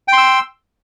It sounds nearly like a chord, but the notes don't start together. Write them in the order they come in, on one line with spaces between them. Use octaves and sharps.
G5 C6 E6